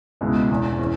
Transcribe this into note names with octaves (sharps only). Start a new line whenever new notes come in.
C#2 B2 G#3 E4
E1 E2 B2
E3 C#4